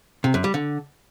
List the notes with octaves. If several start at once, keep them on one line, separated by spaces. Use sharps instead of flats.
C3
F#2
G3
D3